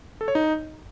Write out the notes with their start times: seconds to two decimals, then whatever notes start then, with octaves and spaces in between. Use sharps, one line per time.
0.21 A4
0.28 C#5
0.35 D#4